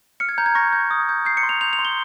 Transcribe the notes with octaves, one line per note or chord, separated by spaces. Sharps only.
F6 C#7
G#6
A#5 G6
G#6
C#6 A#6
G6
D#6
G6
G6 C7
C#7
C6
F7
G6 F7
F7
C6
G7